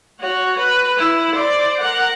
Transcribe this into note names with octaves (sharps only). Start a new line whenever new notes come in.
F#4 C#5
B4
E4
C5 D5
A#4 F#5